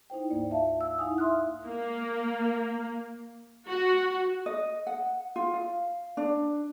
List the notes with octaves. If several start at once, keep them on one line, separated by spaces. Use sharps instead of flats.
D#4 E4 C5 G5
D2 G#2 A#3 D5
A#3 F4 E5 F5 A5
E6
D#4 E4 F5 F#5 G#5 D#6
E5 C6 D#6 F6 F#6
A#3
F#4
D#5
F#5
F4
F5
D4